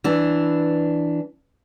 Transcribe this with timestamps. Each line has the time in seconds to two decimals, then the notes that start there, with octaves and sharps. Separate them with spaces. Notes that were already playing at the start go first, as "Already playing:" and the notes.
0.04 E3 D4